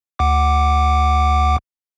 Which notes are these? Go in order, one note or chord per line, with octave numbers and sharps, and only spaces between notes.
D2 F#5 D6